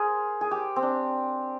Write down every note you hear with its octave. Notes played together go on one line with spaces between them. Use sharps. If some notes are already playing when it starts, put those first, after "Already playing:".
Already playing: G#4 A#4 C5
G#4
G4
C4
D4